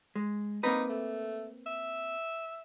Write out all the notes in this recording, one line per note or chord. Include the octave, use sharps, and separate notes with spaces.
G#3
A#3 C4 D#4 B4
A3
E5